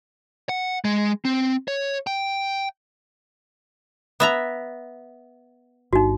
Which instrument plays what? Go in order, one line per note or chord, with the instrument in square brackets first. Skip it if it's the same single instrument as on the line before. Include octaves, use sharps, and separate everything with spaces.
[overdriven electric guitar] F#5
G#3
C4
C#5
G5
[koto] B3 E5 A#5
[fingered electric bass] G1 [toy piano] D#4 F#4